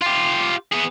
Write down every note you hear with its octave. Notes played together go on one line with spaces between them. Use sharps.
F4 G4
B3 G#4